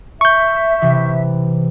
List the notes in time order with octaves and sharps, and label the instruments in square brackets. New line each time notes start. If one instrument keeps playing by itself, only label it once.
[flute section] E5 [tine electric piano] C#6 G6
[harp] C3 E3